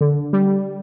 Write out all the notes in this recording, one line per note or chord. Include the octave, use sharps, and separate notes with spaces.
D3
G3